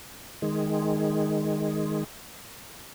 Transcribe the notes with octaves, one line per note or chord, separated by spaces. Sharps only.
D#3 G#3